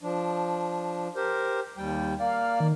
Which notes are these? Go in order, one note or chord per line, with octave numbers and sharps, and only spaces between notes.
F3 D4
G4 A#4 C5
D#2 G3 G5
A#3 D5 F5
D#3